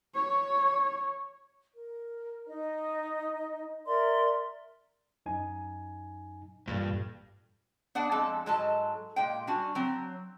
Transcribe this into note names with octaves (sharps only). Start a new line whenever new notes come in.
C#5
A#4
D#4 D#5
A#4 D5 E5 C6
F#2 D#4 G#5
A1 G2 A#2 A4
B3 D4 F#5
F2 G#3 A4
G#2 F#3 G#3 A4 G#5 A5
A#2 G#3 G5
G3 D4 F#4 G#5
F#3 C4